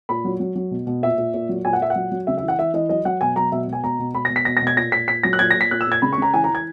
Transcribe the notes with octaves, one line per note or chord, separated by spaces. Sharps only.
A#2 B5
F#3
F#3
F#3
B2
B2
A#2 E5
A#2
A#2
F#3
A#2 G#5
F#5
A#2 E5
F#5
F#3
F#3
C#3 E5
E5
E3
F#5
E3 E5
E3 D#5
F#3 D#5
F#3 F#5
B2 G#5
F#3 A#5
B2 E5
B2 G#5
B2 A#5
B2
B2 B5
A#6
B2
B6
B2 A#6
A#6
B2
G#6
A#2 A#6
A#2 B6
A#2 B6
F#3 A#6
F#6
A#2 G#6
A#6
A#2
B6
A#2 F#6
E6
A#2 G#6
C#3 B5
C#6
C#3 A#5
E3 G#5
A#5
E3
G#6